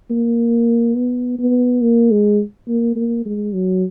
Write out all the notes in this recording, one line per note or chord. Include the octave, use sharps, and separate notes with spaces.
A#3
B3
B3
A#3
G#3
A#3
A#3
G#3
F#3